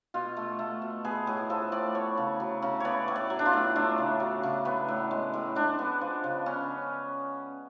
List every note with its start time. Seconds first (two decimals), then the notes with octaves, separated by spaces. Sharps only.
0.14 B2 F4
0.37 A3
0.59 A3
0.82 B2
1.04 B3 G#4
1.27 A2 G#4
1.50 F3 A4
1.72 A2 D5
1.95 B3 C#5
2.17 C#3
2.40 F#3
2.62 C#3
2.80 B3 C#5 D5
3.08 A2
3.16 D5
3.30 F#3
3.39 D4
3.46 F4
3.53 A2
3.76 A3 D4
3.98 C#3
4.20 F#3
4.43 C#3
4.65 B3
4.88 A2
5.11 G#3
5.34 A2
5.55 G#3 D4
5.79 B3
6.01 F3
6.24 C#3
6.46 B3 C#4